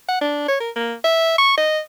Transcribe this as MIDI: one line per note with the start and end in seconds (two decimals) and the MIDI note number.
0.09 0.19 78
0.21 0.44 62
0.48 0.56 73
0.60 0.70 70
0.76 0.93 58
1.04 1.37 76
1.38 1.56 85
1.58 1.79 75